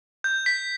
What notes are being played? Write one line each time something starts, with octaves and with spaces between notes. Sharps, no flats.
G6
B6